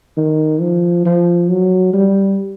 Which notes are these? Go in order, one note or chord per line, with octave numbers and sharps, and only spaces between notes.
D#3
F3
F3
F#3
G3